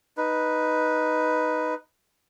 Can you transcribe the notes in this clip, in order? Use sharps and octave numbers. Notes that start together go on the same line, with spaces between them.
D#4 B4